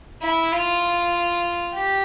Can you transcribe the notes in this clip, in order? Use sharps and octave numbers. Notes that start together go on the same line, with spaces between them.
E4
F4
G4